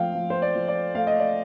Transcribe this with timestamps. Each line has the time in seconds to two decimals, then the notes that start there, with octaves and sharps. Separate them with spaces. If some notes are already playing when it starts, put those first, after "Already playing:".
Already playing: F3 A3 F5 G5
0.15 F3
0.30 C5
0.42 D5
0.55 F3
0.68 D5
0.95 A3 F5
1.07 D#5
1.19 D5